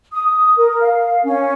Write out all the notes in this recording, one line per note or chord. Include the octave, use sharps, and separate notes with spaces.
D#6
D#6
A#4
F5
C#4